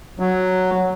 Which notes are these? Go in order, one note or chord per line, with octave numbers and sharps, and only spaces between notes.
F#3